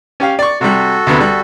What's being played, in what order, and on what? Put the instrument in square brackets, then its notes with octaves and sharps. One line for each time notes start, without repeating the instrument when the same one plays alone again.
[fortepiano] C#4 G4 F5
D5 C#6
[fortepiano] C3 G3 [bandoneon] F#4 A4
[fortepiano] D2 C3 B3
G3